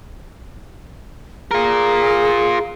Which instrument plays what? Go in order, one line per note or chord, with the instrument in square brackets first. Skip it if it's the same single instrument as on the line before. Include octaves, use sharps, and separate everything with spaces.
[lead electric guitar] F4 A#4 [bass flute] G#4